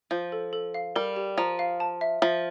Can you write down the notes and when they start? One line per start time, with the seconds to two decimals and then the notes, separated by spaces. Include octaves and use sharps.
0.11 F3 C5
0.32 A4
0.53 A4
0.74 F5
0.96 G3 A#4
1.16 G4
1.38 F3 A#5
1.59 F5
1.80 A5
2.01 E5
2.22 F3 E5